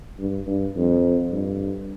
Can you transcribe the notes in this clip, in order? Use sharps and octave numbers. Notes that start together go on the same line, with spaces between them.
G2
G2
F2
G2